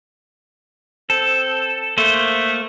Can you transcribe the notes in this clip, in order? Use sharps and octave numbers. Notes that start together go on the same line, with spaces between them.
C4 A4
A3 A#3 C5